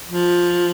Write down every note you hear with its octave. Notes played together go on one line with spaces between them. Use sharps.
F3